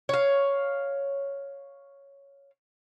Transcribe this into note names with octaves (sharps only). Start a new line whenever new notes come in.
C#5 F5